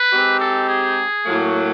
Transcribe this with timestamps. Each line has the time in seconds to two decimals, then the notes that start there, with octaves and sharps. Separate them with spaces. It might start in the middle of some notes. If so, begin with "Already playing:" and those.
Already playing: B4
0.13 G#3 C4 D#4 G4
0.40 A4
0.69 G#4
1.26 A2 F#3 A#3